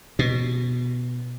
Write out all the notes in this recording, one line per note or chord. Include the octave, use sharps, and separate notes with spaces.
B2